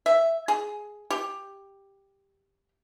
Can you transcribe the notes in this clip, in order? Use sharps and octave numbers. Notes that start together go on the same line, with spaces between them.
E5
G#4
G4